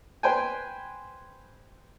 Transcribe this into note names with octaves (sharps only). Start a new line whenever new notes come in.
B4 C5 G5 G#5